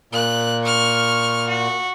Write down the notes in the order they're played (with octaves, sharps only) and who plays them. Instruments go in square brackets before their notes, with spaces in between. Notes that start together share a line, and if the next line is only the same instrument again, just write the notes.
[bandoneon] A#2 [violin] F#6
[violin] C#6 F6
F#4